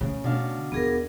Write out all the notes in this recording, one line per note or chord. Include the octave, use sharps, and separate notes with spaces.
C#3 A3
B2 D4 F5
D#2 B3 G#4 A#4